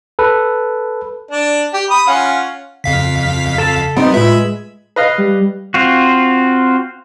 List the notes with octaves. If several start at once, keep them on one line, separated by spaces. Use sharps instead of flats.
A4 B4
D4 D5
G4
B5 D#6
C#4 F4 F#5
F2 C#3 F5 B6
A4 A5
G3 B3 C4 D#4
A2 G#3 F4 B4 E5 B5
B4 D#5 F5
G3
C4 F4 F#4